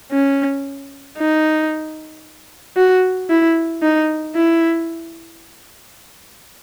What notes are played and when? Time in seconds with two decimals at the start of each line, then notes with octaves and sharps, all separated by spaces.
0.12 C#4
1.18 D#4
2.77 F#4
3.30 E4
3.83 D#4
4.36 E4